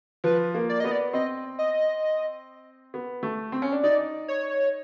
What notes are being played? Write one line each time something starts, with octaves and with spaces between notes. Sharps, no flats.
F3 B4
A#3
D5
B3 D#5
D5
C4 D#5
D#5
B3
A3
C4
C#4
D4
D#4 D5
C#5